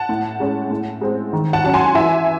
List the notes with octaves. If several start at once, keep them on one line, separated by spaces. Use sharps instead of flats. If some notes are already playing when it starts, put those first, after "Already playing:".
Already playing: F#5 A5
A2
G#3 C#4
A2
G#3 C4
D#3
F#5 A5
F#3 C#4 A5
G#5 C6
E3 E5 G#5